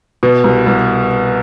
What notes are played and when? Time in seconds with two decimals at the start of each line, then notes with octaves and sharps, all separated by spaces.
0.23 B2
0.44 C2
0.66 C2